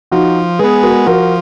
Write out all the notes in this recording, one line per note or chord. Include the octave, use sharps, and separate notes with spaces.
F3 D#4 F#4
G#3 B3 G#4 B4
F#4 A#4
F3 F#4 A#4